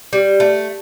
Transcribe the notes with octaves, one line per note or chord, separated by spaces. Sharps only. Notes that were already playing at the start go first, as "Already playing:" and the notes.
G3
A3